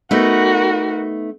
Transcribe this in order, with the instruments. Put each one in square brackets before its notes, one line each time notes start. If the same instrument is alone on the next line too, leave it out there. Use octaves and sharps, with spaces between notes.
[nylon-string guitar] A3 B3 D#4 [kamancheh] F#4 A#4